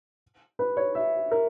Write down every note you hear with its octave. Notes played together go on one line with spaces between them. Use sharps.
B4
C#5
E5
A#4